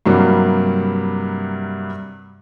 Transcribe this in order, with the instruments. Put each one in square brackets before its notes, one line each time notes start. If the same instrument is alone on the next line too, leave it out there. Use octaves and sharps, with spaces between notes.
[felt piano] G2 C3 F#3 G3 A#3